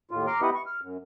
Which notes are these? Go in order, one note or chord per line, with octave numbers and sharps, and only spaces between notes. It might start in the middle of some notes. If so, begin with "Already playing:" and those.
D#2 A2 F4
A#5 C6 D6 F6
B3 E4 G4 B4 D#5 F#5
C#6
F6
F#2